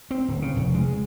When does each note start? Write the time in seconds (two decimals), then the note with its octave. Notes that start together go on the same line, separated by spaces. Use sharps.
0.11 C4
0.28 D1
0.42 C#3
0.57 F1
0.75 G#3